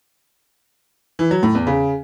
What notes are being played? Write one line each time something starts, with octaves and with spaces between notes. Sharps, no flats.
E3
F#3
A2
E2
C#3